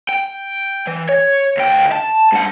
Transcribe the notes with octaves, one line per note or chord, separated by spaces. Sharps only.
G5
E3
C#5
D2 G5
A5
G2 F#5